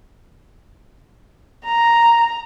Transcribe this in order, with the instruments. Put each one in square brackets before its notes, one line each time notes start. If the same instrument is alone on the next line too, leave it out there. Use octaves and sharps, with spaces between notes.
[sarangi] A#5